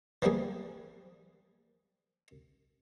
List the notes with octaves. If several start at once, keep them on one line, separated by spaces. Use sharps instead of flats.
E3 F3 G3 A#3 G#4